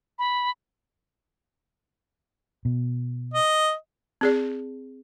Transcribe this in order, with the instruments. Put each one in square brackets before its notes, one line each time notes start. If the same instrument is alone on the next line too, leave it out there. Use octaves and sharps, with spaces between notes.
[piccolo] B5
[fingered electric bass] B2
[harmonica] D#5
[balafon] C4 G#4 D5